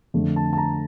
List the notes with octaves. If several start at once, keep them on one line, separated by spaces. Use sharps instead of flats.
F2 D3 A3
A5
A5
A#5